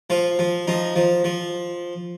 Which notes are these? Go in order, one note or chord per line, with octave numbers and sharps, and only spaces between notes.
F3 F4
F3
F3 D#4
F3
F3